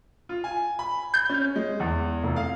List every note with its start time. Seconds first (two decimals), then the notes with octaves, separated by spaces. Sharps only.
0.29 F4
0.44 G#5
0.79 B5
1.14 G6
1.29 C#4
1.56 G#3
1.80 E2
2.23 F1
2.36 F5